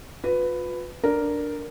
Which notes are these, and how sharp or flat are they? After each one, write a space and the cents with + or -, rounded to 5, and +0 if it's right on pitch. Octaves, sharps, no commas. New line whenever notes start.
F4 +40 B4 +10
D4 +0 A#4 +0